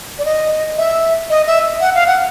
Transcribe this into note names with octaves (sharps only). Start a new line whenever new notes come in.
D5
D#5
E5
D#5
E5
F#5
F5
F#5